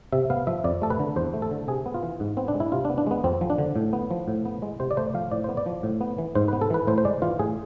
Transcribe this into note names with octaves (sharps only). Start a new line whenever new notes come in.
C3 E5
B3 F5
F3 E5
F2 D5
A3 A4
B4
D3
E2 C5
A3
A4
D3
C3 G#4
B3
F4
E3
G#2
B3 C4
D4
G#3
E4
C3 F4
D4
B3
D4
G#3 B3
F2 C4
F3
D4
D3
A2
B3
F3
A2
B3
G#3
C3 C5
D5
A3 C5
F3 F5
A2 D5
B3 C5
D5
F3
A2
B3
E3
G#2 C5
B4
B3
A4
E3 B4
A2 C5
C5
G#3 D5
E3 F4
A2 G#4